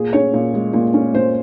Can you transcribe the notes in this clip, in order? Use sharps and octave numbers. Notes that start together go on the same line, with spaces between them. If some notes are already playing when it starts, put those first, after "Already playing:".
Already playing: A#2 G#4
C#4 C#5
A#2
G#3
A#2
C#4
A#2 C5